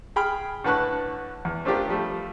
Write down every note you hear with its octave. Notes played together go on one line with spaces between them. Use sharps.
G#4 G5 B5 F6
A2 D3 B4 A5 C#6 F#6
E2
A3 C4 D4 F4 G4 A#4
F3 G3 A3